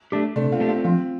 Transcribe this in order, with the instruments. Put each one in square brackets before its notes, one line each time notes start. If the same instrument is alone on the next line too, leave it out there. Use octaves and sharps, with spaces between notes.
[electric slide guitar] A3 D4 G4
[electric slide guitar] C3 [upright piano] A3 D4
[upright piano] C4 F4
[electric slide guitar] A3 D4 G4
[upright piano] C4 F4
[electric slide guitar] F3 [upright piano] C4 F4